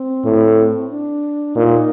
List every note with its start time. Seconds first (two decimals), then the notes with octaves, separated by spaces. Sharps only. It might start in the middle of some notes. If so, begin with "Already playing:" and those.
Already playing: C4
0.25 A2
0.90 D4
1.55 A#2 D#4